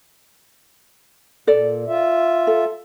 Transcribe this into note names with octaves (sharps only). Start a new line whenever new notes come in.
A#2 A4 D5
F4 E5
A4